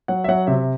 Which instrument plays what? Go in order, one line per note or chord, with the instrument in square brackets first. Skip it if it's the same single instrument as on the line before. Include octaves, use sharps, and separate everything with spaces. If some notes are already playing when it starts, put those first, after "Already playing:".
[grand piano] F#3 F#5
E5
F#3 F#5
C3 E5